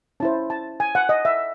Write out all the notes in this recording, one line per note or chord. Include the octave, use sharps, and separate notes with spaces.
C#4 E4 C5 A5
A5
G#5
F#5
D#5
E5